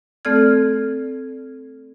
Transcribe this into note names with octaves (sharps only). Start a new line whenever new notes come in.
A3 C4 A4 D5 F6 G#6